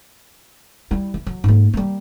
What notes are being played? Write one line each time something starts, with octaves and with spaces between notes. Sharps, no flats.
G3 E4
E3
F#3
G#2 A#3
G3 A#3